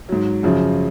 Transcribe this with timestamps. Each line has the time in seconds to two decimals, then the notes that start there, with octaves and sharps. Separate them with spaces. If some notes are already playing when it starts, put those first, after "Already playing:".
0.09 G#2 F#3
0.43 F#2 C#3 F3